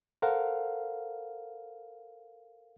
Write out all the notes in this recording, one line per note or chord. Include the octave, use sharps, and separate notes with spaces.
A4 A#4 C5 F5 F#5